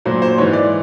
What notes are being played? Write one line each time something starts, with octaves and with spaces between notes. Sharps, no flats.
A#2 F#3 C5
C5
G#2 E3 C#5
D5